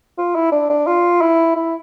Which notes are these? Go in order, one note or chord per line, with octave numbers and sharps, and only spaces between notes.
F4
E4
D4
D4
F4
E4
E4